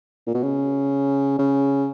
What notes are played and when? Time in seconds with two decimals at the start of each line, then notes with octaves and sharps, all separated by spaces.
0.27 A#2
0.34 B2
0.43 C#3
1.39 C#3